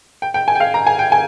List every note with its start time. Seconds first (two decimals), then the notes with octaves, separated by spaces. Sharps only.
0.22 G5
0.34 G5
0.48 G#5
0.55 G5
0.60 F5
0.74 A#5
0.87 G#5
0.99 G5
1.12 G#5